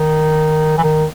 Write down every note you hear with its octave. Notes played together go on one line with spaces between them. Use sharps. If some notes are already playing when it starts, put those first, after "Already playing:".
Already playing: D#3
E3
D#3